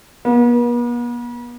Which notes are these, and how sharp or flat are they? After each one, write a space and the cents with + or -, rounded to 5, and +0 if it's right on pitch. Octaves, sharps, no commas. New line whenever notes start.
B3 -45